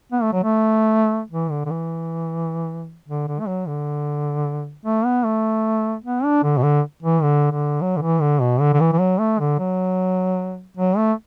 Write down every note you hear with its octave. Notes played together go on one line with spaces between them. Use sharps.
B3
A3
F#3
A3
E3
D3
D3
E3
D3
D3
A3
F#3
D3
A3
B3
A3
B3
D4
D3
B2
D3
E3
D3
D3
F#3
D3
E3
D3
B2
D3
D3
E3
E3
F#3
A3
D3
F#3
F#3
A3